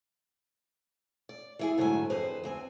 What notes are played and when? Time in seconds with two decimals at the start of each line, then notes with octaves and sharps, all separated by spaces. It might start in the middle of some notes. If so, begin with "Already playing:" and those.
1.29 D5
1.59 E3 E4 G#4
1.78 G#2 D3 F#3 A3 G#5
2.10 F2 G#4 B4 C5
2.43 D2 C4 G#5